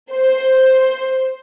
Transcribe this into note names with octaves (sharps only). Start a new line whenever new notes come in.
C5